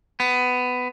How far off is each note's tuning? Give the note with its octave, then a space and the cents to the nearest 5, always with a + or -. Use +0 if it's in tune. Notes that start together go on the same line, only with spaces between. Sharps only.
B3 +15